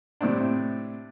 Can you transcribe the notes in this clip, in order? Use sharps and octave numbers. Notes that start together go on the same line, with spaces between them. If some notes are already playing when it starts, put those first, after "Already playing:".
A2 C3 C4 D4